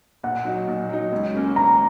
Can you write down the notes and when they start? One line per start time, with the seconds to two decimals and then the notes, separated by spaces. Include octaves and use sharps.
0.23 A#2 F#5
0.45 F#3 D#4
0.68 A#2
0.89 F#3 D#4
1.12 C#2
1.34 C#3 A#3 C#4
1.56 C#2 A#5